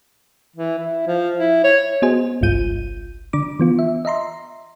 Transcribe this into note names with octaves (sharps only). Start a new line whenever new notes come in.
E3
E4
F3
E4
C#5
B3 F#4 G#4 C5 D#5 G#5
G1 C2 G2 F4 G6 D#7
D3 D4 D6
E3 B3 F4
E5
D#5 E5 A#5 C6